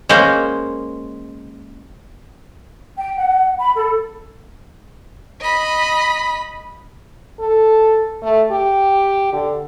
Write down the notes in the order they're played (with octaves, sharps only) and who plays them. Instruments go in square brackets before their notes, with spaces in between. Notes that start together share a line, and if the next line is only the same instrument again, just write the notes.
[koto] G#3 A#3 C#4 C5
[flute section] G5
F#5
B5
A4
[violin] D#5 B5
[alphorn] A4
A3
G4
D3